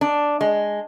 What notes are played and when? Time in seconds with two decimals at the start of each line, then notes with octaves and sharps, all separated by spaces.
0.01 D4
0.41 G#3